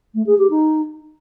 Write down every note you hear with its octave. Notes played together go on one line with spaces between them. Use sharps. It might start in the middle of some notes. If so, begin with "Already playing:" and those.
A3
G#4
G4
D#4